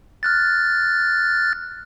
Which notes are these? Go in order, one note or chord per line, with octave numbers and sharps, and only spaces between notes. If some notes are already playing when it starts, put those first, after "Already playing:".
F6 F#6 A6